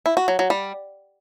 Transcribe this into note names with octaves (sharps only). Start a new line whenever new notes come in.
E4
F#4
F#3
F#3
G3